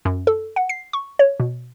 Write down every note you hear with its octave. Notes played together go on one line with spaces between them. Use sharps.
F#2
A4
F#5
C7
C#6
C#5
B2